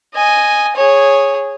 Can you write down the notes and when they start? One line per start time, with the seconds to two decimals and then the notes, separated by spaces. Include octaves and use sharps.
0.15 D#5 G#5
0.76 G#4 C#5